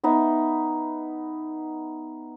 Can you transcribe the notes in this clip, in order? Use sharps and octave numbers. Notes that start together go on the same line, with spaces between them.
B3 D#4 E5